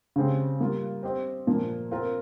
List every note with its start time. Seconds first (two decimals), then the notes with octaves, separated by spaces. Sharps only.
0.16 C#3 G#3 C4 G4
0.60 G3 A#3 F4
1.03 C4 G4 C5 D#5
1.47 A#2 F3 A#3
1.91 C4 F4 A#4